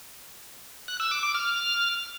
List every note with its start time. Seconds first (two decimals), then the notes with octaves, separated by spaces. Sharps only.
0.88 F#6
1.00 E6
1.11 D6
1.23 D6
1.35 F6